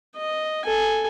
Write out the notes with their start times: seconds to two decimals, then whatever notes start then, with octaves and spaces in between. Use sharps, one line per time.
0.17 D#5
0.65 A4 G#5